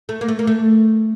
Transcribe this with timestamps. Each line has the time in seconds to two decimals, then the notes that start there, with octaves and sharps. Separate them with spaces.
0.09 A3
0.21 A#3
0.28 A3
0.39 A#3
0.47 A3